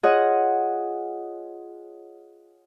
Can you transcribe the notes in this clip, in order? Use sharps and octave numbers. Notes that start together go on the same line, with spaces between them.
F4 G#4 C#5 D#5 F#5